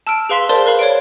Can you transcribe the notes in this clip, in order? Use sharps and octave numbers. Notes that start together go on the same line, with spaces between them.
A5 E6 F6 D7
G#4 B4 F5 C6 B6 E7
A#4 C5 D5 A5 C6
A#4 B4 F5 B5
C#5 D5 F5 D7